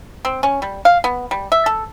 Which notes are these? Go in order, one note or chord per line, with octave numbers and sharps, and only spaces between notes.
C4
C#4
G3
F5
B3
G3
E5
A4